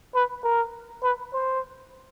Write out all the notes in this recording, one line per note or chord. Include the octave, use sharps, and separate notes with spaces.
B4
A#4
B4
C5